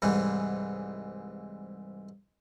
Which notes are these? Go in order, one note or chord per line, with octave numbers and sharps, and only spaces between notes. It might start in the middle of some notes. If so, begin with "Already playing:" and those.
C2 G#2 E3